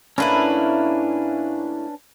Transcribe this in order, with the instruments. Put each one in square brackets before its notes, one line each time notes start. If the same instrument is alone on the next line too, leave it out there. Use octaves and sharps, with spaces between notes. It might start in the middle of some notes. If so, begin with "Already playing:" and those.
[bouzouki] A2 A#3 E4 [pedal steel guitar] C#4 D4 B4